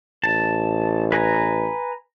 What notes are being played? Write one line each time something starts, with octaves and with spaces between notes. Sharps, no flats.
A1 A5
B4 G#5 A#5